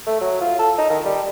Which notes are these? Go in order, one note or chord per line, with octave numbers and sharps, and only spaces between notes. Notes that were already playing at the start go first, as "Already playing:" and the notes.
A3
F#3
F4
A4
D#4
D#3
G3